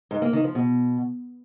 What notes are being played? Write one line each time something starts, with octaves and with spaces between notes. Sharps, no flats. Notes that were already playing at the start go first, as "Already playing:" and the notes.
G#2
A#3
D#3
F3
B2